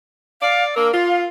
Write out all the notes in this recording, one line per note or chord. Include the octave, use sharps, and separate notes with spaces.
D5 F5
A#3 D4 A#4 E6
F4 F5